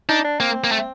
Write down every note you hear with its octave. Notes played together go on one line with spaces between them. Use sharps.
D4 D#4
D4
A#3 C4
A#3
A3